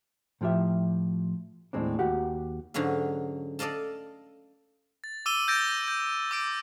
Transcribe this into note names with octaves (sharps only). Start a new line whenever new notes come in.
A2 F3 F4 G4 E5
D#2 A2 G#3 C4 D4
D#2 F#4 G4 F#5
G#2 D3 F#3 C#4 F5
A4 D5 D#5 F5 A5
A6
D6 E6 D#7 G7
E6 G6 A6 A#6 D7
G6
D6 E6 D7